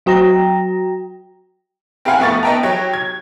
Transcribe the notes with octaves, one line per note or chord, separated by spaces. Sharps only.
F#3 F#4 G5 A#5 A#6
C4 G4 B4 F5 F#5 G#5
F2 A3 B3 C#6 A6
B3 D#5 E5 G5 A5 A#5
F#3 G4 C#5
G#6